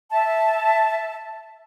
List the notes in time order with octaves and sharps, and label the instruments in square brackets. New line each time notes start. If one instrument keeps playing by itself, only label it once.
[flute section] E5 A5